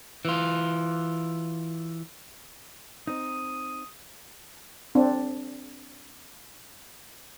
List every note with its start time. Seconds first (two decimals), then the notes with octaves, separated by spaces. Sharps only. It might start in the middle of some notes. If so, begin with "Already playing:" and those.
0.25 E3 F4
3.07 C4 D#4 D#6
4.95 C4 D4